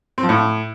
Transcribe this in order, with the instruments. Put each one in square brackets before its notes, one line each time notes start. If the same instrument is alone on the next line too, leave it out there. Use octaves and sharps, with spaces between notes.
[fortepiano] C4
F3
A2